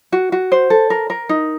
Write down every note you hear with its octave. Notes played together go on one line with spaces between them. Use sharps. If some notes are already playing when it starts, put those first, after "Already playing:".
F#4
F#4
C5
A4
A#4
A#4
D#4